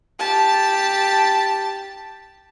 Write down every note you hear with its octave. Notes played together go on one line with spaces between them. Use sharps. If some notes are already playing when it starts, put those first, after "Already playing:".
G4 A5